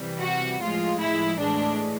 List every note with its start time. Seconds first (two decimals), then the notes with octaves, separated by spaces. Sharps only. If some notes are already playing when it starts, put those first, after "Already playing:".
Already playing: C3 E3 G3
0.22 F#4
0.61 A2 F3 G#3 F4
1.01 E4
1.40 A2 E3 G#3 D4